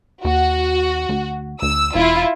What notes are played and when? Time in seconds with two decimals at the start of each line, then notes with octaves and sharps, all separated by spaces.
0.25 D#2 F#4
1.09 D2
1.62 D2 E6
1.95 E1 E4 F4